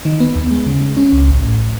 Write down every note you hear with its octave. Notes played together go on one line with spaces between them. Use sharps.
D#3
B3
D#2
G#3
C#3
G#3
C#4
C#2
A1
A2